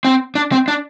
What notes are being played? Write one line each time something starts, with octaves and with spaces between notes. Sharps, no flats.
C4
D4
C4
D4